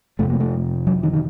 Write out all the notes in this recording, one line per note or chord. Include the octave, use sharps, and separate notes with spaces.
F2 C3 A3
A#3
A3
F#3
D#3
D#3